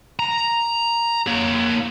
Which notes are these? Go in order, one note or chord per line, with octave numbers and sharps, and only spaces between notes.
A#5
A#3 C#5